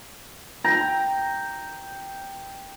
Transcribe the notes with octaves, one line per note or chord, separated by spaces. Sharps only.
G5 A#5